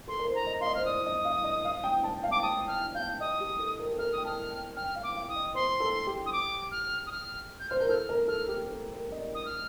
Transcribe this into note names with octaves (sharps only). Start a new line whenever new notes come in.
A4 C6
A#4
C5
A#5
D#5
F5 C6
D#5
C5 F6
D5 D#6
D#5
F5
D#5
F5
G5
A5
F5
D6
A5 D#6
G5 F6
F5 G6
D#5 D#6
G4
A4
A#4
A4
A#4 F6
D#6
G5
A5 F6
G5
G5 F6
F5
D6
F5
D#6
D#5
C5 C6
A4
G4
D#6
D6
F6
D#6
F6
G6
C5 F6
A#4 G6
A4 F6
A#4
A4 F6
G4
A4
A#4
D#5
D5
D#6
F6